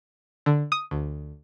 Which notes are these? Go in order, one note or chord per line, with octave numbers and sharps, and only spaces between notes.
D3
D#6
D2